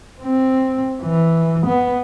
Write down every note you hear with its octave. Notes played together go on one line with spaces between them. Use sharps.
C4
E3
B3